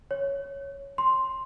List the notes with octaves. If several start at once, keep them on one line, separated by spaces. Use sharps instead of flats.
C#5
C6